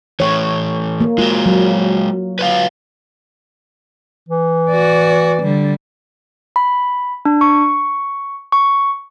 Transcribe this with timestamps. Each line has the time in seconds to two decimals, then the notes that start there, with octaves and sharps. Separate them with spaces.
0.20 E3 A3 C#5
1.01 A#3
1.18 G#3 F4 F#4
1.46 F#3
2.39 B4 C#5 F5
4.28 E3
4.70 F#4 D5
5.42 D3 G3
6.56 B5
7.25 D4
7.41 C#6
8.52 C#6